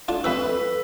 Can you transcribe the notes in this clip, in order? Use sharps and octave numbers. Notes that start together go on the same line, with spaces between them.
D4 F4 A4 A5
F2 C3 B4 B5 E6